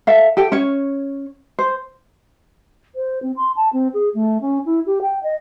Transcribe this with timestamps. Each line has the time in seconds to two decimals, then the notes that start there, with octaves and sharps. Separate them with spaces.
0.07 A4 E5 F5
0.37 G4 A4 G5
0.52 C#4 C#5
1.59 C5
2.95 C5
3.22 C4
3.37 C6
3.56 A5
3.73 C4
3.94 G#4
4.14 A3
4.41 C#4
4.66 E4
4.86 G4
5.02 G5
5.23 D#5